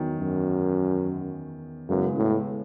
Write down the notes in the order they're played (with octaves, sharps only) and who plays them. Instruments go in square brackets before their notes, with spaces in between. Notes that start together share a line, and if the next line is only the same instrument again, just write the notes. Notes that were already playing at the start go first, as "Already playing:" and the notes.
Already playing: [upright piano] E2 D#3 F#3
[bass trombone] F#2
[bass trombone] F#2 [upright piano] C#3 G#3 B3 E4
[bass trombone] A2